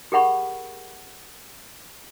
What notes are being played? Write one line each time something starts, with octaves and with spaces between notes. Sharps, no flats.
G4 G#4 A#4 F#5 B5 C#6